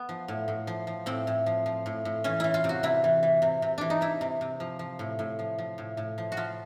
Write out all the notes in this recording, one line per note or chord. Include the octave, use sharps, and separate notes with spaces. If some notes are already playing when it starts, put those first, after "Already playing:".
Already playing: B3
F3
A2
A2
F3
F3
A2 C4
A2
F3
F3
A2
A2
E3 C#4
E3 E4
F4
C3
F#4
C3 E4
E3
E3
C3
C3
E3 D4
D#4
E3 E4
C3
C3
F3
F3
A2
A2
F3
F3
A2
A2
F3
F#4
F3 F4